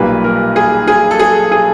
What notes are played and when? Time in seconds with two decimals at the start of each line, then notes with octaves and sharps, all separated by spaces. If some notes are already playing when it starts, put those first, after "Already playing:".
Already playing: B1 A#2 G3 A#3 B4
0.24 A#4
0.56 G#4
0.87 G#4
1.11 A4
1.19 G#4
1.52 G#4